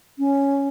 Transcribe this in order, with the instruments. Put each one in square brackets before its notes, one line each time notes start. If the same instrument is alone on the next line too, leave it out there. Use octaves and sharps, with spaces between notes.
[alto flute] C#4